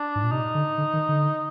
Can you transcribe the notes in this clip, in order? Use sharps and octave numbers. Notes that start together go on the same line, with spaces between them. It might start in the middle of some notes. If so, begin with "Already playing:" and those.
Already playing: D4
G#2
A#2
C3 D#4
D3
D3
D#3
D3